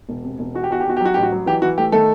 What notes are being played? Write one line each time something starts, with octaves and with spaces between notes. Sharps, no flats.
E1
C3
E1
E2 F#4
G4
E2 F#4
G4
E2 F#4
G4
F#3 F#4
A1 G4
F#4
F#3
E3 G4
E3 F#4
A3 G4
D#3 A3 A4